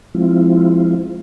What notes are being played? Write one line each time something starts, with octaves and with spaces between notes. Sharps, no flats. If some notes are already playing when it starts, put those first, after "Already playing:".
F3 G#3 C4 E4 F4